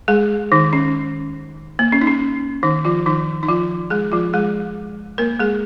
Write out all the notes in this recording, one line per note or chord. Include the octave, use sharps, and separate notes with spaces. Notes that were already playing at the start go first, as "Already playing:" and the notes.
G#3 G#4
D#3 D#4
C#4
A#3
C#4
D#4
C#4
D#3 D#4
F3 F4
D#3 D#4
D#4
F3 F4
G#3 G#4
F3 F4
G#3 G#4
A#3 A#4
G#3 G#4